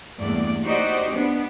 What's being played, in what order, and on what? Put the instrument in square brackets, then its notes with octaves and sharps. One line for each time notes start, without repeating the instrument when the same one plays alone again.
[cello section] E2 G2 A3 A#3 D5
D#4 F#4 G4 C5 D5 D#5
B3 D4